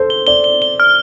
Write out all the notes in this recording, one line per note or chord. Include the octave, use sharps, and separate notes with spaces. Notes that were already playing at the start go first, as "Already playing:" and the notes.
Already playing: A4 C5
G7
D5 G7
G7
G7
F6